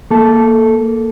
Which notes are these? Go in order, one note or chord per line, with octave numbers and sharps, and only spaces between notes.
A#3 A4